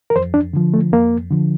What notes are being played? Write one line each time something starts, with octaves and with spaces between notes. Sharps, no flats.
A#4
F2 C5
D4
D3 F3
A3
F2 A#3
D3 F3